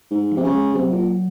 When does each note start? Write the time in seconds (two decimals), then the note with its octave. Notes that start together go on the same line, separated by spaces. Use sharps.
0.11 G#2
0.32 F3
0.37 C3
0.43 C#3
0.53 G#3
0.75 C3 F#3
0.92 A#2